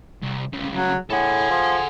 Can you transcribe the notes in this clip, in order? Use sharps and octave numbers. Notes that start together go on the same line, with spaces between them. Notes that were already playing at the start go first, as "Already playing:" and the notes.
C2
C2 C#3
F#3
A2 G#4 A4 F#5
F3